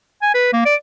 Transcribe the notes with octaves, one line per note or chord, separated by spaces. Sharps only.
G#5
B4
A#3
D5